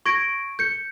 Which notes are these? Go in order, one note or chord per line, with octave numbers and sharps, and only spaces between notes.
C#6 G#6 A#6 D7
G6 C#7